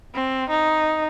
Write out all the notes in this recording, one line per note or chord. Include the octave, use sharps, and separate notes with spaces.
C4
D#4